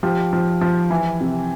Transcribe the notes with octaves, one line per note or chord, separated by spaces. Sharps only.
F3 G4
F3
F3
E3
C3